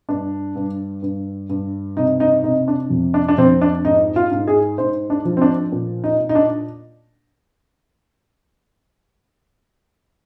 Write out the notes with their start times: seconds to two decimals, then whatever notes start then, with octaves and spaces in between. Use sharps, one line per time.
0.09 G2 D4
0.55 G2
1.02 G2
1.50 G2
1.97 C3 D#4
2.20 D#4
2.44 C3 D#4
2.68 D4
2.90 F2
3.14 D4
3.28 D4
3.38 F2 C4
3.61 D4
3.85 G#2 D#4
4.16 F4
4.31 G#2
4.48 G#4
4.78 G#2 C5
5.10 D4
5.25 F3
5.37 C4
5.41 D4
5.72 A#2
6.04 D#4
6.20 A#2
6.29 D#4
6.35 D4